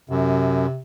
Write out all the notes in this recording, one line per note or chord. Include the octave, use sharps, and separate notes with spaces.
F#2 C3